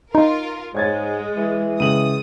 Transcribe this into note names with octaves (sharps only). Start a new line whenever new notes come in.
D#4 F4 A#4
G#2 G#3 C#5 G#6 A6
E3
C#2 D#6 D#7 F#7